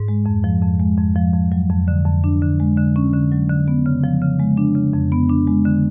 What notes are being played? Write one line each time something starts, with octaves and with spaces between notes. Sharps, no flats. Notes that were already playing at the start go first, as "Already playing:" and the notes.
Already playing: G#2
G#3
F2
F3
F2
G#3
F2
F3
F2
F#3
F2
D3
F2
D4
D3
G#3
D3
C#4
D3
F#3
D3
B3
C#3
F3
C#3
G#3
D4
C#3
F2
B3
D4
G#3
D3